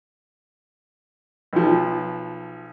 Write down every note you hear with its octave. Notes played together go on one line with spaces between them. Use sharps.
B1 F3